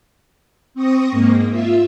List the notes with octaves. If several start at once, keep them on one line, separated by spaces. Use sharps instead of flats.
C4 C#6 D#6 A#6
G#2 A#3
F4 E5